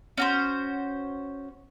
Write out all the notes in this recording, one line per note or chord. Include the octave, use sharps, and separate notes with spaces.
C#4 F#4 C5